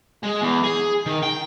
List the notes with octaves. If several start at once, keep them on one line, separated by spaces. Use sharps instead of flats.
G#3
E2
G#4
D#3
G5